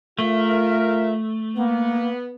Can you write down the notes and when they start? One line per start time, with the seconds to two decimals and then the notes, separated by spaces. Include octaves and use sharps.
0.19 A3 F4 A#4 E5
1.56 A#3 B3